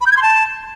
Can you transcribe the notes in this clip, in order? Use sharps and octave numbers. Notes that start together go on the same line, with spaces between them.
B5
G6
G#6
C6
A5